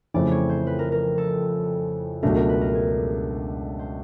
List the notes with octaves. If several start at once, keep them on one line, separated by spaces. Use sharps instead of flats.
F2 C#3 E3 A3 C4 D5
C#5
C5
B4
A#4
A#4
A4
C#2 B2 F#3 A3 D4 A#4
A#4
B4
A#4
G#4
C5